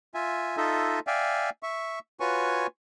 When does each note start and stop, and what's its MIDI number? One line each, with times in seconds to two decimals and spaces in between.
0.14 0.57 65
0.14 0.57 76
0.14 0.57 80
0.57 0.99 63
0.57 0.99 65
0.57 0.99 69
0.57 0.99 75
0.57 0.99 76
1.07 1.50 74
1.07 1.50 76
1.07 1.50 77
1.07 1.50 79
1.07 1.50 80
1.63 1.99 76
1.63 1.99 85
2.20 2.67 65
2.20 2.67 66
2.20 2.67 71
2.20 2.67 73
2.20 2.67 80
2.20 2.67 85